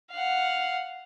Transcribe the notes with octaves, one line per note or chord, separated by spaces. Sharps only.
F5 F#5